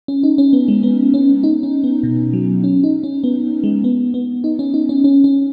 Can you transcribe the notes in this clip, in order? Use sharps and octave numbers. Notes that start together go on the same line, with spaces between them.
C#4
D#4
C#4
B3
G#3
B3
C#4
D#4
C#4
B3
B2
F#3
C#4
D#4
C#4
B3
G#3
B3
B3
D#4
C#4
D#4
C#4
C#4
C#4